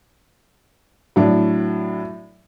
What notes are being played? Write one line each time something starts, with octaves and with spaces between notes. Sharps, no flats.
A2 F#3 D4